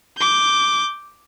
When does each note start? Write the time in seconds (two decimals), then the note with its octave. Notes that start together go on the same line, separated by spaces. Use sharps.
0.17 D6 G6